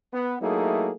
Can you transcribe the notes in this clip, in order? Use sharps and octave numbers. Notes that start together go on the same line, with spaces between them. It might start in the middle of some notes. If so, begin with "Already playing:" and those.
B3
F#3 A3 A#3 D#4 E4 G#4